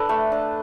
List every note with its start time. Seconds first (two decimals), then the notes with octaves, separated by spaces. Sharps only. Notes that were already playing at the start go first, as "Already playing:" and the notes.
Already playing: D4 A4 B4
0.09 A3
0.32 D4